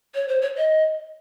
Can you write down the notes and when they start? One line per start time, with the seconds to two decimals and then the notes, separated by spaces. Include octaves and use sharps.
0.15 C#5
0.28 C5
0.42 C#5
0.57 D#5